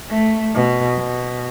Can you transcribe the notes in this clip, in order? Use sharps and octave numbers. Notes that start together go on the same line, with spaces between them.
A3
B2
B2